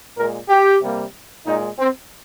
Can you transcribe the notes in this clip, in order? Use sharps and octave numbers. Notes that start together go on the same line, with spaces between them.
A#2 G#3 A#4
G4
C3 G3 A#3
A#2 G#3 D#4
C4